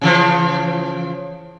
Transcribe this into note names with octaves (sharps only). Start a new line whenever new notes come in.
C#3 E3 F3